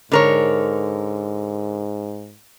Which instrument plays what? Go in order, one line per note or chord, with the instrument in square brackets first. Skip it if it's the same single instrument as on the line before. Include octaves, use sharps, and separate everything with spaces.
[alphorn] G#2 [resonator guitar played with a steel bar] D3 A#4 C#5